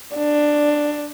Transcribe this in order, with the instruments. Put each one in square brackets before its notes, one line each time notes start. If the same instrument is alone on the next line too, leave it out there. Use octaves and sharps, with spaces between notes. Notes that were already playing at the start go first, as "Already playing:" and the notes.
[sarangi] D4